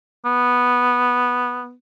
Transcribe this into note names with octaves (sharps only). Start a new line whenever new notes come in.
B3